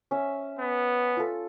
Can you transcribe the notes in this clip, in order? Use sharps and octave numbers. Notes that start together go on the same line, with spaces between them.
C#4 E5
B3
F4 A4